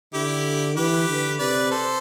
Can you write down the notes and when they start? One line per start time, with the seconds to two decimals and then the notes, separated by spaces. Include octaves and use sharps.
0.14 D3 E4 G4
0.77 E3 G4 B4
1.08 D3
1.39 C3 B4 D5
1.71 A4 C5